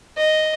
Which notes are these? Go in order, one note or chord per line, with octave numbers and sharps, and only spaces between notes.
D#5